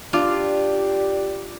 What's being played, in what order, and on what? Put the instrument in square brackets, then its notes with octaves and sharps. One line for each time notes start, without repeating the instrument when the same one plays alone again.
[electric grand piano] D4 D6 [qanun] F4 [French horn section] G4 D5